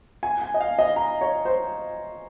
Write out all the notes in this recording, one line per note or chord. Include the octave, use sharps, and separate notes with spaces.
G#5
G#5
D#5
F5
D#5
A#5
C#5
C5